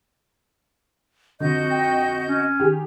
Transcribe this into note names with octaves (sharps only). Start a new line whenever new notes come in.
F2 D3 F#4 D#5 G6
G5
C#4
D#3 G4 G#4